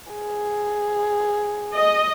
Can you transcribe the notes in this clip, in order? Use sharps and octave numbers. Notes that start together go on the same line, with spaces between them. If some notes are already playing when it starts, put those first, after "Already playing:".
G#4
D#5